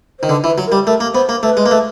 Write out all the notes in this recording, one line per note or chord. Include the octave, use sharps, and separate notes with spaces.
D#3 C5
D3 B4
E3
B4
F#3
A#4
G3
A3 A#4
A#3
B3 C5
A#3
A3 B4
G#3
A#3
A3